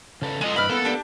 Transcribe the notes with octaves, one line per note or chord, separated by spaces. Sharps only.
C#3 A4 B4
G#3 F4 G#4 A4 D#5
G2 B2 E4 B4 D#5 B5 F6
A#3 B3 A4
D4 G4